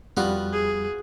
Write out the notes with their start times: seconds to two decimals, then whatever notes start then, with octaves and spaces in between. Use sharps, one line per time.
0.17 F2 G3 B3 F4 F#4
0.53 G#4